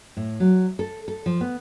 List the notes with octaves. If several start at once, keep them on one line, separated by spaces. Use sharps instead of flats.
A2
F#3
A4
A4
F3
B3